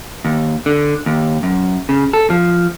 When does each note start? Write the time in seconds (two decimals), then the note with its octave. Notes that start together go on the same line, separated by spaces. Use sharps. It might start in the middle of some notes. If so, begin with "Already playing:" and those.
0.25 D#2
0.66 D3
1.06 D#2
1.43 F#2
1.89 C#3
2.13 A4
2.30 F3